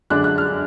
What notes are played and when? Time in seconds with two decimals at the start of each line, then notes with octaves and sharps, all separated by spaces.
0.10 F#2 D3 G#3 D4 F#6
0.24 F#6
0.38 F6